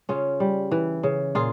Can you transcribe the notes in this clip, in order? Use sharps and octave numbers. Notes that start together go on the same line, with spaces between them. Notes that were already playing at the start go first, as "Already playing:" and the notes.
C#3 C#4 F4
G3
E3
C#3
A#2 F4 G#4